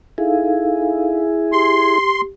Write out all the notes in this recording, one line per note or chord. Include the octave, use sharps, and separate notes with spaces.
D#4 E4 G#4 A4 F5
G4 C6